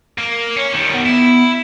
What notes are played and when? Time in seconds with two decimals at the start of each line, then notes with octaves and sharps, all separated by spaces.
0.18 A#3
0.57 C#4
0.74 D#3 G3
0.93 B3
1.06 E4